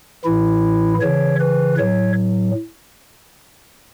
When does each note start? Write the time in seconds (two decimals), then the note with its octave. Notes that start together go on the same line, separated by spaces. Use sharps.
0.24 A2 E3 E4
1.01 C#3 E3 C#5
1.40 B4
1.78 A2 F#3 C#5